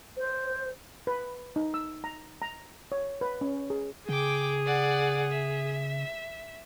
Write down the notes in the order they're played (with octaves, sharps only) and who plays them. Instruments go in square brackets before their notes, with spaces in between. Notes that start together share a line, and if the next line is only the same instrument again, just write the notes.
[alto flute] C5
[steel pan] B4
D#4
E6
A#5
A#5
C#5
B4
C#4
G#4
[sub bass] C#3 [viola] G#4 [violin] G5 D6
[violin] D5 F#5
E5